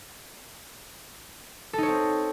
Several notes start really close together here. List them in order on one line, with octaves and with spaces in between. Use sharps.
A4 D#4 C#5 C4